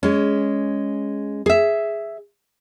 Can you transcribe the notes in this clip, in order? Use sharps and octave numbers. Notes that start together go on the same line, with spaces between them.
G#3 C#4
G#4 E5